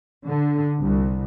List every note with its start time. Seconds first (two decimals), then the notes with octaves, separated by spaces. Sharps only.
0.25 D3
0.80 C2